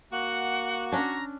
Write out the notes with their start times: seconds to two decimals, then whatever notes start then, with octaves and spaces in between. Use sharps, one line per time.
0.11 A#3 F#4 F#5
0.92 C#4 D4 A#5